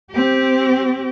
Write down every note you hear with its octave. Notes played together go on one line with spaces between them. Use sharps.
C4 G4